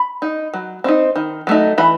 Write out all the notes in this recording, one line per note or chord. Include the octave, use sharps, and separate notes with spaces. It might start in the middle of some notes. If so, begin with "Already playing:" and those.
Already playing: B5
D#4
F#3
C4 D#4
D#3
F#3 A3 D#4
E3 B5